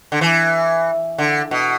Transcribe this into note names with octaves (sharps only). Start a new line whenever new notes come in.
D3
E3
D3
B2